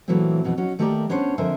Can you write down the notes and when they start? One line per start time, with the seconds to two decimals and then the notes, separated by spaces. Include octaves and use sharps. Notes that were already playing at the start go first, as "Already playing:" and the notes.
0.08 A#2 E3 F#3 A3 A#3 C4
0.44 F2 B2 E3 D#4
0.58 F#3 C#4 D#4 F#4
0.79 D#3 A3 A#3 G4 A#4 D5
1.09 B3 C#4 D4 C5 C#5
1.38 F2 D3 A#4 C5 E5 G#5